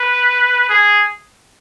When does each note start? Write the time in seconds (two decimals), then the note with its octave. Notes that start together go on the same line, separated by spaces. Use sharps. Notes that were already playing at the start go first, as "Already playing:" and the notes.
Already playing: B4
0.69 G#4